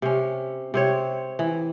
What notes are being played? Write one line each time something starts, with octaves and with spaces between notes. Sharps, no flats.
C3 C#4
C3 C4 C#5
E3